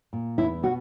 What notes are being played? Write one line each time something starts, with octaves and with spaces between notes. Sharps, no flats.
A#2
E2 E4
B2 F#4